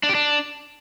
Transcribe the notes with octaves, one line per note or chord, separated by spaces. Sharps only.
D4
G4
D4